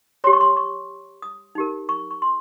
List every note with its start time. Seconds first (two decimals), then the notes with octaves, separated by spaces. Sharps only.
0.24 G4 C#5 C6
0.33 C#6
0.41 C6
0.57 C#6
1.22 D#6
1.55 D#4 G4 A#4
1.89 C#6
2.11 C#6
2.22 C6